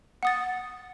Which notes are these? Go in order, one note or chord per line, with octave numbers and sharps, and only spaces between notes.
F#5 D#6 A6